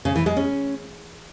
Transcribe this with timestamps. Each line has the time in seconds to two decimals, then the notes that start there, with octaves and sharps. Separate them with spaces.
0.05 C#3
0.16 E3
0.26 G#3
0.37 C#4